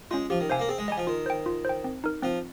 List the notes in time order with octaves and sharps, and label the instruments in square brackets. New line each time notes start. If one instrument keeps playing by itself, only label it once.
[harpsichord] G#3 [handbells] C#4 F4
[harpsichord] F3 [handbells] G4
[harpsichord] D#3
[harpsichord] C3 [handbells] C5 F5 G#5
[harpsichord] A#3
[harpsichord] C4 [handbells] G#4
[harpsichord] G#3
[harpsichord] G3 [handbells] D#5 G#5
[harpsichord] F3
[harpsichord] D#3 [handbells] F4
[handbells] C5 G5
F4
C5 G5
C4
D#4 A#4
[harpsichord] F3 [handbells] C4